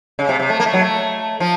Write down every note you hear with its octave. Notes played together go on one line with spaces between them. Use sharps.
C#3
C3
C3
A3
A#3
A3
F#3
A3
F3